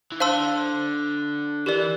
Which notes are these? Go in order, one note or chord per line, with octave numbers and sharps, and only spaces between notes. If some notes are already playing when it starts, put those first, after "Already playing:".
E3
D3 C5 F5 A5 C6 E6
E3 G4 A#4 D5